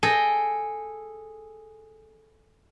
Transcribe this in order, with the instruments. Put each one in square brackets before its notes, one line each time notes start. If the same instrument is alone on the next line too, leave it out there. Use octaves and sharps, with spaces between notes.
[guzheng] G#4 A4 D#5 G5